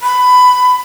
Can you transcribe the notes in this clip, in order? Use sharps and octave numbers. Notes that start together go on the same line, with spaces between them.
B5